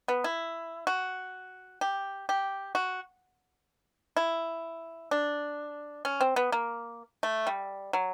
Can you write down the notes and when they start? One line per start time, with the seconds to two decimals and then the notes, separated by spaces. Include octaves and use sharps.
0.08 B3
0.24 E4
0.87 F#4
1.81 G4
2.29 G4
2.75 F#4
4.17 E4
5.11 D4
6.05 C#4
6.21 C4
6.36 B3
6.52 A#3
7.23 A3
7.47 G3
7.93 F#3